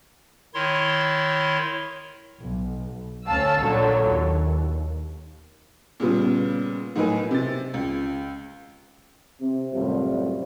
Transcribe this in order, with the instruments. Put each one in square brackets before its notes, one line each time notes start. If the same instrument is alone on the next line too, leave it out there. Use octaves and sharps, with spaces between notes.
[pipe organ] D#3 E4 C#5 C6
[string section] B1
D2 C#4 F5 A5 E6
A#1 A#2 D3 F#3 A4 C#5
D#2
[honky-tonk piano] A#2 C#3 G3 B3
A2 F#3 D#4 A#4 B4 G#5
C3 A6
C#2
[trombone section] C3
C2 F#2 A2 F3 G3